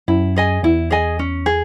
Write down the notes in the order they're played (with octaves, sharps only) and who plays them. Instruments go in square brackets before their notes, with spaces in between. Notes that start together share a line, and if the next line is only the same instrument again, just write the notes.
[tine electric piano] F#2 [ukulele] E4
[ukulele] G#4 D#5 G#5
[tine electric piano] E2 [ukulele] E4
[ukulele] G#4 D#5 G#5
C#4
G#4